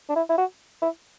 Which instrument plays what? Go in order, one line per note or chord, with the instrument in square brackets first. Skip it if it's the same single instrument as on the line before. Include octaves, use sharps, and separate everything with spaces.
[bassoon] D4
E4
E4
F#4
E4